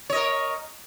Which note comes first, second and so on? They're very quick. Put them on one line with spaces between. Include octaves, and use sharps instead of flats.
C#5 D#5 A#4